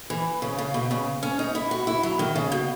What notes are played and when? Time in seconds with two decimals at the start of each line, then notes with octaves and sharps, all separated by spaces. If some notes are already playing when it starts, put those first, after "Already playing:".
0.10 E3
0.42 C#3
0.58 C#3
0.74 B2
0.91 C#3
1.23 C#4
1.39 D#4
1.55 E4
1.71 F#4
1.87 E4
2.03 F#3
2.19 D#3
2.36 C#3
2.52 B2